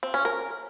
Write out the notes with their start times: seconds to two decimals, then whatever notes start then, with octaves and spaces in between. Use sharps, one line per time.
0.03 C4
0.14 C#4
0.25 A#4